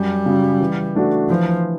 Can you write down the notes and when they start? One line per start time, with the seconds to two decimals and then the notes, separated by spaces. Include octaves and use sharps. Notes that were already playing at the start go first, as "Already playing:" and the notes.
Already playing: F#2 G3
0.26 C#3 F#3
0.60 E3
0.95 A3 D4 F#4
1.29 E3 F3